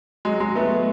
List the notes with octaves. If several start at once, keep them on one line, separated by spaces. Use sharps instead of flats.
F#3 G#3
F#3 G#3
A3 B3